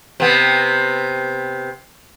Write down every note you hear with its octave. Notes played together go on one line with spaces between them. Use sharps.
C3 B3